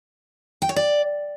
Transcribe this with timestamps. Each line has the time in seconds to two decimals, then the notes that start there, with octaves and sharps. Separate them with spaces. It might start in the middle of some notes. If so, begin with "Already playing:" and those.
0.62 G5
0.69 C#5
0.76 D5